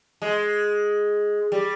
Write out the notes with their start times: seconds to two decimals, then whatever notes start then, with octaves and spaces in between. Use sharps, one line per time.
0.22 G#3
1.52 G3